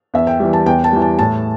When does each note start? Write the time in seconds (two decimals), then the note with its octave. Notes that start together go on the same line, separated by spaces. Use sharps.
0.14 E2 E5
0.27 G5
0.40 E3 G3
0.53 A5
0.66 E2 G5
0.84 A5
0.93 E3 G3
1.02 A5
1.19 A2 A5